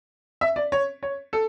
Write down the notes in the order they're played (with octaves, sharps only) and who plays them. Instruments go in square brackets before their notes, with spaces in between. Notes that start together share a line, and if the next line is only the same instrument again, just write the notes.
[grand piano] E5
D5
C#5
C#5
A4